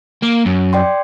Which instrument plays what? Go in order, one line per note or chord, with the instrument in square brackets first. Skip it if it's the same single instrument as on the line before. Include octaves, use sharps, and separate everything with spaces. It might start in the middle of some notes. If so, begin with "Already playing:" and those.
[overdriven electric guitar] A#3
F#2
[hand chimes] D5 G5 C6